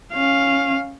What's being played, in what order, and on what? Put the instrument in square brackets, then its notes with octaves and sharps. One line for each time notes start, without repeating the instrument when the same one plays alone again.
[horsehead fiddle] C#4 F5